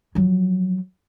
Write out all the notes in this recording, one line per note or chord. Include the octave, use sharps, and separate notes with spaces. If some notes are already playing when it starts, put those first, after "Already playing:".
F3 F#3